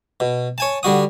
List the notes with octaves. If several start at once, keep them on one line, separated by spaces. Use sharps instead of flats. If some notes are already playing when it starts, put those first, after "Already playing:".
B2
C#5 G#5 A5
D3 G3 F#4 D#6